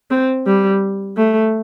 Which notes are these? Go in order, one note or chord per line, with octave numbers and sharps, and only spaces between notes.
C4
G3
A3